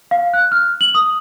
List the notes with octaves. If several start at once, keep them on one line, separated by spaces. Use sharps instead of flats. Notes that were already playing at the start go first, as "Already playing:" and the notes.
F5
F#6
F6
F#7
D#6